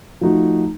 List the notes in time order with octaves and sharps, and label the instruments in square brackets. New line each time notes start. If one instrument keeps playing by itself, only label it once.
[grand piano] F3 A3 D#4 F#4